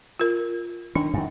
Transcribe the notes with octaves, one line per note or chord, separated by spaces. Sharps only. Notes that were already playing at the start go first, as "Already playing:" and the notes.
F4 A#4
D#3 D4
F#2 D#3